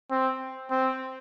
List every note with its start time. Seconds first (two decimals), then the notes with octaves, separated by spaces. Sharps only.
0.11 C4
0.71 C4